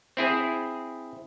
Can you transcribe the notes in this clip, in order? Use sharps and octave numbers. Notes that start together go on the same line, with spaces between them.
C4 E4 G#4